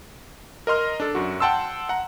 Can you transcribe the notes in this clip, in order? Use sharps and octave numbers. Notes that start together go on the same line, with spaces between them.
A#4 D#5 C6 F6
D4 A4
F#2 F#4
F#5 G5 A5 C6 E6
F#5 A#5